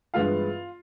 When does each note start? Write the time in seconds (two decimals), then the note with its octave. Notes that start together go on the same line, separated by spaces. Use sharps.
0.14 G2 E3 G#3 B3 E4 F4 F5